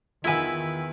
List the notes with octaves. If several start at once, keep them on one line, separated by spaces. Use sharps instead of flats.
E2 D#3 E4 F4 B4 F#5 G#5 E6